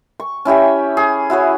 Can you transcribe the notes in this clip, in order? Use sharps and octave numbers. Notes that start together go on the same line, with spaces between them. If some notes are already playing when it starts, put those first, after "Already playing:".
C#6
C#4 E4 G4 E5
G#4
E4 F#4 G#4 C#5